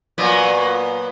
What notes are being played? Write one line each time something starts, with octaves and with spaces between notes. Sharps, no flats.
A#2 F#3 B3